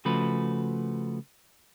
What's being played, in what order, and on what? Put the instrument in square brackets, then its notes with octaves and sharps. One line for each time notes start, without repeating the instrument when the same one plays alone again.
[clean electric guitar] C#3 F3 A3 F#4 B4